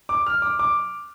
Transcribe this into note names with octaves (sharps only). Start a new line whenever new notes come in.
D6
F6
D6
D6